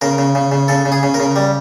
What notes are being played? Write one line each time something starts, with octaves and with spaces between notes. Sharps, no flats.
C#3 A#4
C#3
C#3
C#3
C#3 A4
C#3
G#4
C#3
A#4
C#3
G3